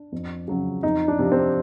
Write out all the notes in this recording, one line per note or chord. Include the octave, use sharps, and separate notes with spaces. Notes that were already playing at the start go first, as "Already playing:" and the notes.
Already playing: D4
F2
C#3 F#3
F2 D#4
D4
C3 F3
C4